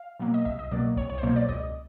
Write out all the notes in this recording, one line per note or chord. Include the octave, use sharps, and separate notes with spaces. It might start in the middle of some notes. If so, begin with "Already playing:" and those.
Already playing: F5
B2 F#3 A#3
D#5
C2 E5
D#5
B2 F#3 A#3 D5
C2 C#5
C#5
C5
B2 F#3 A#3 C#5
D5
C#2 D#5